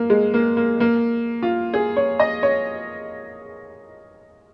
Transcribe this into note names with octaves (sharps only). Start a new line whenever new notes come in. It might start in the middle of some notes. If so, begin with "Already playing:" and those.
Already playing: A#3
G#3
A#3
A#3
A#3
F4
G#4
C#5
D#5
C#5